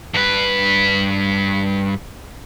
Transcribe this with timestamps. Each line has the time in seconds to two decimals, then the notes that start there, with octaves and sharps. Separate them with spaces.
0.14 G2 B4